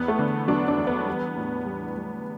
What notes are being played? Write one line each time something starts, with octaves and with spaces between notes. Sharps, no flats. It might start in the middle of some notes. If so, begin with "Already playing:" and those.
Already playing: E2 B3
A3
D3
F#3 D4
D4
E2
B3
G3
A2
G3
G3